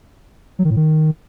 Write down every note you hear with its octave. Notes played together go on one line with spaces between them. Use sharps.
F#3
D#3
A2
D#3